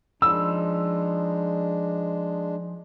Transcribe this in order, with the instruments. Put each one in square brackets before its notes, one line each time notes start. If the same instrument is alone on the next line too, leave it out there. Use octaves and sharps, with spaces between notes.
[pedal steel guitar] F3 D#4 B5 [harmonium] G#3 D4 [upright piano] E6